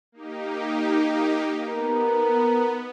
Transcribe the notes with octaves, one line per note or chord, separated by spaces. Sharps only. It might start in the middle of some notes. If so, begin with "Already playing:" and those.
A#3 D#4 G4
B3 A#4